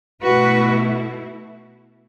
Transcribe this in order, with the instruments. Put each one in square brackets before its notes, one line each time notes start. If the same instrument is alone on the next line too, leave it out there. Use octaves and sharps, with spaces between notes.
[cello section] B2 A3 E4 F#4 B4